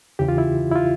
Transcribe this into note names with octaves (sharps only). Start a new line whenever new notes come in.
E2 C#3 E3 G4
F4
E4
E4
F4